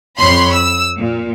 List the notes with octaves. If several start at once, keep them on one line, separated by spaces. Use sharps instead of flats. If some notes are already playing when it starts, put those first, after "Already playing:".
F2 C#5 B5 C6
E6
A#2